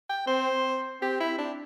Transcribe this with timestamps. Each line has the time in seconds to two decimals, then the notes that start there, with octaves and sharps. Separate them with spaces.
0.09 G5
0.27 C4 C5
1.01 C4 G4
1.20 E4
1.38 D4